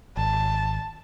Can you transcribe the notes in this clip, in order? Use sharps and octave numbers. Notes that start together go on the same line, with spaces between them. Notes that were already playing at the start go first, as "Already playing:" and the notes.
G#1 A5